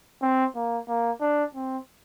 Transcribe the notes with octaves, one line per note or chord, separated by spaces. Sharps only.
C4
A#3
A#3
D4
C4